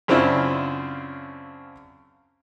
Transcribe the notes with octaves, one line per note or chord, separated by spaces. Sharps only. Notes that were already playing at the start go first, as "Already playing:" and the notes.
F#2 C#3 C4 D4 E4 F4